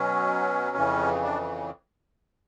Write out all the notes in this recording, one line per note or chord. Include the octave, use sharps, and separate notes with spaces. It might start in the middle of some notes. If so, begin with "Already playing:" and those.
Already playing: B2 F#3 C#4
F2 C#3 E3
D4